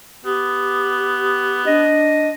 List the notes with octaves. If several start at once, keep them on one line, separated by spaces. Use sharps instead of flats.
B3 G4
D4 D#5